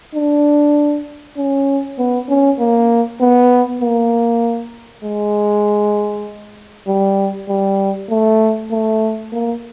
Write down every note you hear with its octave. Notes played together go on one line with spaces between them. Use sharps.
D4
C#4
B3
C#4
A#3
B3
A#3
G#3
G3
G3
A3
A3
A#3